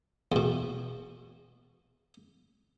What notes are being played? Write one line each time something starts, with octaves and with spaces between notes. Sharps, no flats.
E2 B2